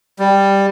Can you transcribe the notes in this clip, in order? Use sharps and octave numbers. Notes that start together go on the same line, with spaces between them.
G3